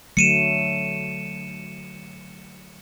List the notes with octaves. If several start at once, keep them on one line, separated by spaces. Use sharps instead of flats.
D3 F#3 A3 C#7 D#7 E7